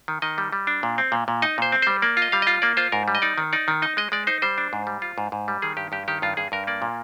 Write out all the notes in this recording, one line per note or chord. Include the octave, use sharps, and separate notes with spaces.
D#3
D#3 D#5
G3
G3
D4
A#2
C4
A#2
A#2
D#4 D#5
A#2 C5
C4
G3 C5
A#3 D5
F4
D#5
G3 F5
F4 D#5
A#3 D5
F4 C5
G#2 A#4
G3
D#5
D#4 D5
D#3
D#4 D5
D#3
D#4 D#5
G#3 D#5
G#3 D5
D#4 C5
G3 C5
D4
G#2
G3
F4
G#2
G#2
G3
D#3 G#4
G2 G4
G2 G4
D#3 G4
G2 F4
G2 G#4
G2 A#4
A#3 D5
A#2